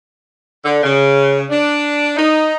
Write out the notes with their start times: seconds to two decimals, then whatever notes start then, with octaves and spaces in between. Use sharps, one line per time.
0.65 D3
0.83 C#3
1.50 D4
2.17 D#4